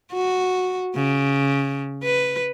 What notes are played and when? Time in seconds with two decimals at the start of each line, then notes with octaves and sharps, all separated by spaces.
0.12 F#4
0.95 C#3
2.04 B4